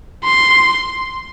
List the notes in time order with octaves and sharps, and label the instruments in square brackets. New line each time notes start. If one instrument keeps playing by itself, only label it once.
[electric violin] C6